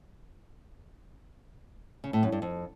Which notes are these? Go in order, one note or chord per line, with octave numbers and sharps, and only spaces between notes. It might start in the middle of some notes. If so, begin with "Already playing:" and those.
C#3
A2
F#2
G2
F2